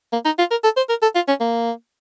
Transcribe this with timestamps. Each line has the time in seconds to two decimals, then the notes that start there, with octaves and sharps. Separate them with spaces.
0.13 A#3
0.25 D#4
0.38 F4
0.51 A#4
0.64 A4
0.77 C5
0.89 A#4
1.02 A4
1.15 F4
1.28 C#4
1.41 A#3